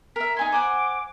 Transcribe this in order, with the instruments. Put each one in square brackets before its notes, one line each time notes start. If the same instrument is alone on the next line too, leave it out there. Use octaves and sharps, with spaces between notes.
[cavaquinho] A#4 E5 [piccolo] B6
[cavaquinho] D#4 G#5 C6 [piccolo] G#6
[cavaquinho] C5 F#5 G#5 [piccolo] D6